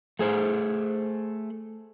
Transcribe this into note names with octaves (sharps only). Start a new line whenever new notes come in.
A3 G#4 C5